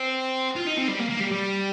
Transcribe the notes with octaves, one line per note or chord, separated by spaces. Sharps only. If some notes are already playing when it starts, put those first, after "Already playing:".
Already playing: C4
F4
D#4
C4
G3
A#3
A#3
G3
G3